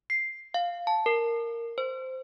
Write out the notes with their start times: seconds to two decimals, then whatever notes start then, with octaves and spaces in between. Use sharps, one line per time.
0.10 C7
0.54 F5
0.87 A5
1.06 A#4
1.78 C5